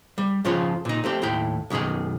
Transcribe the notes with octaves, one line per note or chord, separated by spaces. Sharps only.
G3
F2 C#3 F3 F4 C#5
A#2 D#4
A3 C4 G4
D#2 A2 E4 G5
B1 F#2 D#3 G#4 G#5